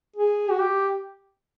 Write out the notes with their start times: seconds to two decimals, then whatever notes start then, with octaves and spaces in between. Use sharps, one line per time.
0.16 G#4
0.51 F#4
0.60 G4